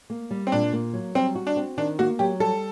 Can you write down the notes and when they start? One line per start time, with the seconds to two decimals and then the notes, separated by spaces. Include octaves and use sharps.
0.10 A#3
0.31 G3
0.47 C4
0.52 A#2 D4
0.73 A#3
0.93 F#3
1.15 G3 C4
1.35 F#4
1.47 D4
1.56 C4
1.77 D#3 D4
1.99 A#3 F#4
2.19 F#3 G4
2.40 G3 A4